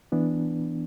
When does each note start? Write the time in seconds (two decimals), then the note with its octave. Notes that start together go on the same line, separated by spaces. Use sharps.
0.12 E3 B3 D4